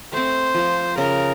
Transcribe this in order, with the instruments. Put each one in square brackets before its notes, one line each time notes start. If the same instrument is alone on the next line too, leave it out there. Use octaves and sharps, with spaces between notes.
[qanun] A3 C4 [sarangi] C5
[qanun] F3 F4
[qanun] C#3 [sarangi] A#4